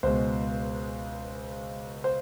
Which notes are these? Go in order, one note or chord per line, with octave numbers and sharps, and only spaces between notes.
C#2 B2 G#3 C5
C5